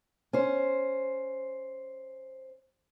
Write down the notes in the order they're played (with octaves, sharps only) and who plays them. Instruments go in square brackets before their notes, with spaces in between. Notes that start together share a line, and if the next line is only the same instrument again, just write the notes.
[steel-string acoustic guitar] C#4 C5